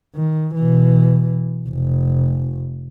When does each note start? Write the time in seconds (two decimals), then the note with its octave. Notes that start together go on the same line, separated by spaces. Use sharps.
0.15 D#3
0.55 B2 E3
1.69 F1